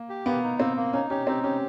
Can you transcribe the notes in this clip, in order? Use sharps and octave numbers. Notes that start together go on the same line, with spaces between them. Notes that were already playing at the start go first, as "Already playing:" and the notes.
Already playing: A#3
G4
A#3 B3
D#4
A#3 C4
A#3
C#4 D#4
C#4 G4
C4 D#4
C#4 G4